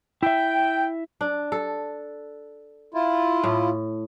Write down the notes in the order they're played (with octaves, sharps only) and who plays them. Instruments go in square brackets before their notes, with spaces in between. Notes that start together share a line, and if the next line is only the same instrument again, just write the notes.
[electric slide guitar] E4 E5 [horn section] G5
[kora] D4
A4
[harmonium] E4 F4
[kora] A2